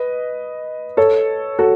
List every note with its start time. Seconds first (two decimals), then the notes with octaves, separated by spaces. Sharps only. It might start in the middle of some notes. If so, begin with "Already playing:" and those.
Already playing: B4 D#5
0.97 A4 C#5
1.59 F#4 A4